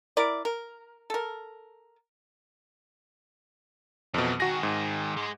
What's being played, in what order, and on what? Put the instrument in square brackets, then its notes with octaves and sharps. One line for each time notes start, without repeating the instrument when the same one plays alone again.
[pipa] E4 A#4 D5
A#4
A4 A#4
[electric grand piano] F2 B2 [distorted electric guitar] E3 F#3
[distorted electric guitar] D#3 G#4 [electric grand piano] F#4 A#6
[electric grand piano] G#2
[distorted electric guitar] G#3